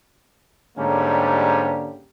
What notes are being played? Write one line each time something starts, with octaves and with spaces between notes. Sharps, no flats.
G#2 D3 G3 A#3 C#4 G4